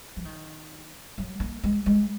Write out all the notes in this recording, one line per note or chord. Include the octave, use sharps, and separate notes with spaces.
F3
D#3
F#3
A#3
G#3
G#3